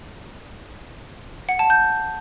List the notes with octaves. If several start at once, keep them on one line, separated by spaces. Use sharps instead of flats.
F#5
A5
G6